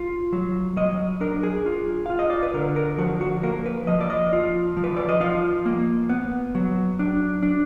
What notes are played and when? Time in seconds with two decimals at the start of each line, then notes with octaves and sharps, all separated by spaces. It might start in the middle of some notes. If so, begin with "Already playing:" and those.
Already playing: F4
0.33 F#3
0.76 F#3 D#5
1.21 D4 A#4
1.43 G#4
1.66 F4
2.06 F4 F5
2.19 D#5
2.30 D5
2.43 B4
2.54 D3 A#4
2.76 A#4
2.98 F3 F#4
3.21 F#4
3.43 A#3 A#4
3.66 B4
3.87 F3 D#5
4.01 D5
4.10 D#5
4.33 F4
4.77 F3
4.84 B4
4.97 D5
5.09 D#5
5.20 F4 F5
5.66 A#3
6.09 B3
6.55 F#3
6.99 D4
7.43 D4